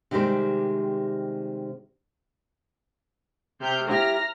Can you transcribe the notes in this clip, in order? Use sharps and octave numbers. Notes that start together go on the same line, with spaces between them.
C3 D#3 G3 G#3 G4 C5
C3 F6 G6
E4 G4 A#5 F6 A#6